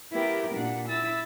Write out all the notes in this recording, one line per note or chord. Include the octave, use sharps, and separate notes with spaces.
B3 E4 G4 A#4 G5
A#2 D4 F#5
E4 E6 A6